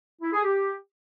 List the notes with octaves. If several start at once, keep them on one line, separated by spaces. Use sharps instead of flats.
E4
G#4
G4